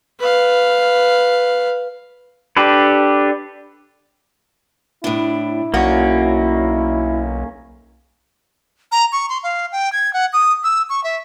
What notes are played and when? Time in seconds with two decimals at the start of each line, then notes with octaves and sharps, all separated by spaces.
0.20 B4 F5
2.57 D4 G4 A4 B4
5.04 A2 D4 E4
5.74 B1 A#3 C#4 D#4 F#4 D5
8.92 A#5
9.12 C#6
9.29 C6
9.43 F5
9.72 G5
9.93 G#6
10.13 F#5
10.33 D#6
10.64 E6
10.89 C#6
11.04 E5